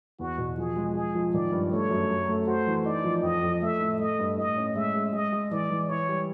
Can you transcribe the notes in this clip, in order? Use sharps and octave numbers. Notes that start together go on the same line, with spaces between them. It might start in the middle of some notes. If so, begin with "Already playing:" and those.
E2 F#4
B2
F3 G#4
G#3
G#3 G#4
F3
D#3 D5
G2
A3 C#5
F#2
F#3
A3
F#4 C5
E3
D#4 D5
F3
F2 D#5
F2
A3 E5
A2
A3 D#5
G2
A2 D#5
C#4
G#3 E5
G#3
G#3 D#5
G#3
E3 D5
E3
E4 C#5
G3